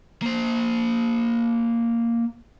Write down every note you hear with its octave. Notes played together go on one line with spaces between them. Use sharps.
A#3 C5